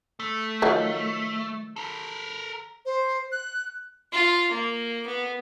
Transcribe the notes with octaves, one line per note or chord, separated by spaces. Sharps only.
A3
D#3 F3 F#3
A4 A#4
C5
F#6
F4
A#3
B3